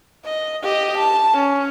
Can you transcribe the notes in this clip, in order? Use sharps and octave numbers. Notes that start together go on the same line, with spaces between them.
D#5
G4 D#5
A5
C#4